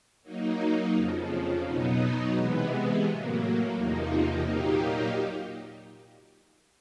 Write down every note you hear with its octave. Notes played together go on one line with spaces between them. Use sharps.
F#3 A#3 D#4
F2 C#3 F3
B2 F#3 B3 D#4
C3 E3 G#3 B3
A2 F#3 A#3
E2 C3 F3 A#3 D#4
A#2 F#3 A#3 D#4 G4